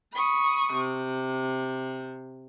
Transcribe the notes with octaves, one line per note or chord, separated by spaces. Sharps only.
B5 C#6 D#6
C3